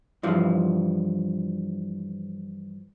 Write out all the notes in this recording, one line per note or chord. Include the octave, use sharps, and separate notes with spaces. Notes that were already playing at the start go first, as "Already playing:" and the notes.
G2 E3 F3